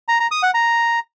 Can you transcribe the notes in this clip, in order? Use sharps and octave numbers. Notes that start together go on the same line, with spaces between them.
A#5
A#5
D#6
F#5
A#5